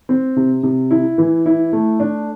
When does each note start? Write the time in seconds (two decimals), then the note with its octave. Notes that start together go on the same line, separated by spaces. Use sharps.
0.09 C4
0.36 C3
0.63 C3
0.91 E4
1.18 E3
1.46 E4
1.73 A3
2.00 D4